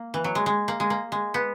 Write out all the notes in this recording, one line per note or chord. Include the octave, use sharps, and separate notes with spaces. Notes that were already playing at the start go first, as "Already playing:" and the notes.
Already playing: A#3
E3
F#3
G#3
G#3
A#3
G#3
A#3
G#3
B3